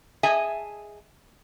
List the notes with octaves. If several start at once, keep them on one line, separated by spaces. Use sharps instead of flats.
G#4 D#5 E5 G#5 A5